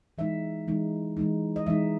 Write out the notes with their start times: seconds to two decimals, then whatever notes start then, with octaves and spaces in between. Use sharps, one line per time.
0.18 E3 G#3 D#4 E5
0.68 E3 G#3 D#4
1.17 E3 G#3 D#4
1.56 D#5
1.66 E3 G#3 D#4 E5